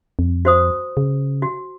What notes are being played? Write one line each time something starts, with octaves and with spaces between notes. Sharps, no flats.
F2
F#4 C5 D#6
C#3
F#4